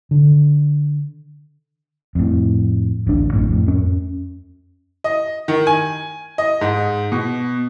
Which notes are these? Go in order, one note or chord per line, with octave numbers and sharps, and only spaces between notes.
D3
F2 A2
D1 A1 D4
A1 F#2 A2
F2 A2
F2 C#4
D#5
D#3
G#5
D#5
G#2
B2